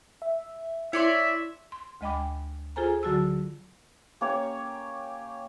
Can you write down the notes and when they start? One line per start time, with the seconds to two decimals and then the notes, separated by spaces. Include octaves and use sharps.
0.22 E5
0.93 E4 C#5 D5 E5 C6
1.72 C6
2.01 D2 G#3 D#5 G5 B5 D6
2.76 F4 G#4 A4 C5 G#5 A#5
3.03 D3 F#3 F#4 A5 E6
4.21 A#3 C#4 G4 C#5